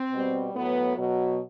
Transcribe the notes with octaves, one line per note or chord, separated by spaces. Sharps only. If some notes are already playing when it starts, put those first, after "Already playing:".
Already playing: C4
B2 G3
A2 F#3 B3
B2 F#3